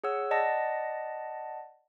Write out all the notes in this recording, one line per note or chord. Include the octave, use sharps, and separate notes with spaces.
G#4 C#5 F#5 E6
D5 D#5 F#5 A5 A#6